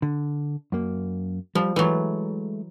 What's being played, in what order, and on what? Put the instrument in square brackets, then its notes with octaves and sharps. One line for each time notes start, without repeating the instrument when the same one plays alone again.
[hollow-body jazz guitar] D3
F#2 A#3
[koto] F3 [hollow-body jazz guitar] G3
[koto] E3 F#3 [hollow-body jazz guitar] G#3 A3